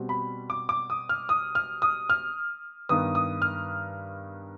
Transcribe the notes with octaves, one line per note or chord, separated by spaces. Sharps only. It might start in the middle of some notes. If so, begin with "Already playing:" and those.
Already playing: B2 G3 C4
B5
D6
D6
D#6
F6
D#6
F6
D#6
F6
G2 D#3 B3 D#6
D#6
F6